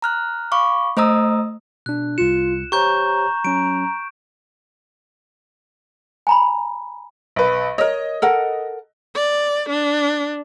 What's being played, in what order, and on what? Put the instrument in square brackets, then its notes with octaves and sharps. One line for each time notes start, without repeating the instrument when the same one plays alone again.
[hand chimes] A#5 F6 F#6
F5 B5 C#6 D6
A3 C5 D#5 A#5 D#6 E6
[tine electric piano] B2 D4 [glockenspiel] F#6
[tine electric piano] C2 C#7 [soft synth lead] F4 [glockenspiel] E7
[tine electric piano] G4 C5 C#5 [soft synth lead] A#5 [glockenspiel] C#6 G6
[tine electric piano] F#3 C#4 [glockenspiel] D7
[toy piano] G#5 A#5 B5
[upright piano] B1 B4
[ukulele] A#4 C#5 [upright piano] D#5
[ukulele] A4 A#4 F#5
[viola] D5
D4